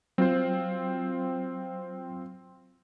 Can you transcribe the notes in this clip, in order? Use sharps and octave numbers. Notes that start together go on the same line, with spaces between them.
F#3 C4 F4 C5